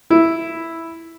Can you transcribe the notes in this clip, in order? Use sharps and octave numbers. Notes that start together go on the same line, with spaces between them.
E4